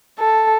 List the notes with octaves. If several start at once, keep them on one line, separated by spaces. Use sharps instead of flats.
A4